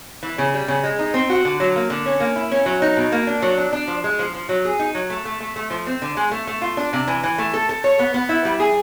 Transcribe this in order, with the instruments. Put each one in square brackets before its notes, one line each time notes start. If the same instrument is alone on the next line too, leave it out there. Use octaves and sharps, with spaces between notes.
[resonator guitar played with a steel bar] E3
C#3
G3
C#3
G#3
D#4
C4
F#4
D3
F#3
A#3
D3
C#4
A#3
E4
C#4
F#3
D#4
B2
A#3
D4
F#3
D4
D4
F3
G#3
F3
F3
F#3
G#4
D#4
F#3
A3
A3
A3
A3
F3
C4
D3
G#3
A3
A3
F4
D4
C3
E3
E3
A3
A4
A4
C#5
B3
B3
E4
G3
G#4